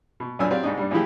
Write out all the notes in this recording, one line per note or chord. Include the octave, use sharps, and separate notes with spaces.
B2
B1 F#2 A#2 D4 G#5 E6
F#3 C4 G4 D5 F5
C2 G#2 D4 D#4
G2 G3 D4
B1 E3 F3 G#3 E4 G4